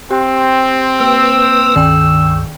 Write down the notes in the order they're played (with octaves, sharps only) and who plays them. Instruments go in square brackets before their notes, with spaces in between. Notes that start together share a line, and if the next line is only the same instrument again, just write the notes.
[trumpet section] C4 [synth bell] G4
[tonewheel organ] A#3 B4 [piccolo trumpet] E6
[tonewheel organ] C#2 G2 [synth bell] D#3 G5